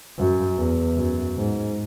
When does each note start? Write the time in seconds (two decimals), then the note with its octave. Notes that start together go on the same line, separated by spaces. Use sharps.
0.19 F#2
0.58 E2
0.97 F#2
1.36 G#2